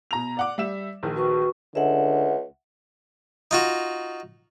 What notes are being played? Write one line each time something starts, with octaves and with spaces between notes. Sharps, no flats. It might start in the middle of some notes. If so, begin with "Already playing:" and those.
B2 A#5 F7
D5 F#5 D6
G3 E5 E7
A#1 D#3
F#4 B4 C#6
C#2 D3 E5 F#5
D#4 F4 F#4